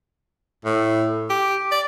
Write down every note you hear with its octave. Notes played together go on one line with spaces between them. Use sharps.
A2
G4
D5